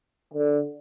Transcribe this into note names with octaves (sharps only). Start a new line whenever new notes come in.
D3